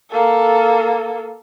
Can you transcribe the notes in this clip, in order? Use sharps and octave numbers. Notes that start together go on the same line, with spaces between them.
A#3 A4